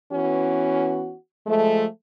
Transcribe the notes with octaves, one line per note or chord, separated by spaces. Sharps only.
E3 B3 C#4 F#4
F3 G#3 A3